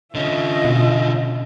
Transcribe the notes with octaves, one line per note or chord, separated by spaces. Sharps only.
D3 C#4 F4 D#5 E5
B2